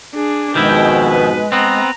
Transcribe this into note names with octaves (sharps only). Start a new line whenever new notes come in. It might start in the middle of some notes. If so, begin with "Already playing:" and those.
D4 G#4
F2 G#2 B2 D#3 G#3 E4 G5
B4
B3 C4 A#5